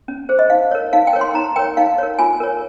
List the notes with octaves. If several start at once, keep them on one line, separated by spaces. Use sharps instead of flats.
C#4
G#4 C5
D#5
D#4 F5
A#4 C#5
D#4 F5
G5
A#4 C#5
C6
D#4 A#5
A#4 C#5 G5
D#4 F5
A#4 C#5
F4 G#5
A#4 C#5